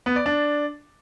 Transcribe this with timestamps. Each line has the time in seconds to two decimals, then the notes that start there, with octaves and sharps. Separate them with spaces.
0.06 B3
0.16 D5
0.26 D4